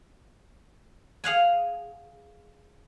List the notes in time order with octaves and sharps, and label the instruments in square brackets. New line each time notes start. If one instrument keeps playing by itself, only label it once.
[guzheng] G#4 F5 F#5 G#5